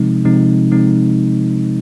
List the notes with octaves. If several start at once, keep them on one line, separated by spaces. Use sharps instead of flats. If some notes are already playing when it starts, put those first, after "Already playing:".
Already playing: C3 F3 G#3 C4 D#4
C3 F3 G#3 C4 D#4
C3 F3 G#3 C4 D#4